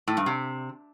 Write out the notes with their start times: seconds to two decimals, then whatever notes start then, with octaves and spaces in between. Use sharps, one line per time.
0.08 A2
0.17 G2
0.26 C3